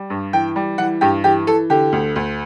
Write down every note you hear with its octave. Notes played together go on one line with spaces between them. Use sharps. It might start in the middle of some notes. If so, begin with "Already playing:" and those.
Already playing: G3
G2
E3 G5
G3
E3 F#5
G2 G4
E3 G4
E3 A4
D3 G4
D2
D2